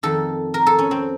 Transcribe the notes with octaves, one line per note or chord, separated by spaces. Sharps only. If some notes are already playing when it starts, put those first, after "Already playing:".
F2 D#3 A4
A#4
A4
C#4
C4